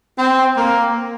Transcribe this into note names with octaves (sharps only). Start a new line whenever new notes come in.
C4
A#3